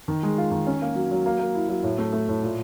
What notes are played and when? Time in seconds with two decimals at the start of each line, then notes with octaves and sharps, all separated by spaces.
0.08 D#3
0.23 G#3
0.38 F4
0.52 D#3
0.67 C#4
0.82 A#3
0.95 F#3
1.11 F#3
1.26 A#3
1.39 A#3
1.55 E4
1.69 F#3
1.83 A2
1.98 A3
2.13 A3
2.28 A2
2.43 A#2